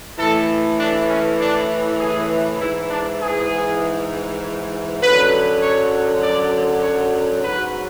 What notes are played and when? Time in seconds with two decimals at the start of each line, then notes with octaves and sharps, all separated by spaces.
0.18 A2 E3 A4
0.79 D4
1.09 C#4
1.40 D4
1.99 G#4
2.60 G#2 E3 E4
2.90 D4
3.20 G#4
5.02 F#2 D3 F#3 B4
5.61 C#5
6.21 D5
6.82 C#5
7.43 G#2 F#3 B4